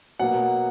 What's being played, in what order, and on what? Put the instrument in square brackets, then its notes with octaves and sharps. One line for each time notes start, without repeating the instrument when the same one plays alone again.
[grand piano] B2 F#3 A#3 F#5